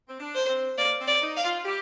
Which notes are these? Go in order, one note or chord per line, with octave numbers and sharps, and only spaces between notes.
C4
D4
C5
C4
A#3 D5
C4
D5
D#4
F5
F4
G4